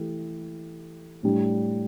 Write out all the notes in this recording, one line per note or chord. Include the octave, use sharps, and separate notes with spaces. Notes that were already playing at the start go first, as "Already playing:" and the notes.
Already playing: E3 A3 G4
A2 G3 D4